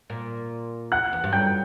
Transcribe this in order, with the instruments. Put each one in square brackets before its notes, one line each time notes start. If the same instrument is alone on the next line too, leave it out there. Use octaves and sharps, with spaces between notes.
[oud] A#2
[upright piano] F#5 F#6
[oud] E2
G2
[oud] F#2 [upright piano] G5 G6